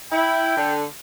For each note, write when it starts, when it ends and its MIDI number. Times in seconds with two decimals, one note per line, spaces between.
0.12 0.54 64
0.12 0.75 79
0.57 0.83 50